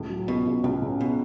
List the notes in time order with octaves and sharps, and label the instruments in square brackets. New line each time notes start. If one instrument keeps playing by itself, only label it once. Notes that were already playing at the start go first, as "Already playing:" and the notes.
Already playing: [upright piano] C#2 [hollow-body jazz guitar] A2
[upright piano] F#3
[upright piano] C#2 [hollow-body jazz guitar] B2
[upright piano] C#2
[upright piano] C#2 [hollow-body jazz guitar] A2
[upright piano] C#3
[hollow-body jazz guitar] B2